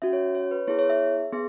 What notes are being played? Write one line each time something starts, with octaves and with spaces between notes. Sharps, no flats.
C#4 F#4 E5
C#5
C#5
B4
B3 E4 G#4 C#5
C#5
E5
B3 G#4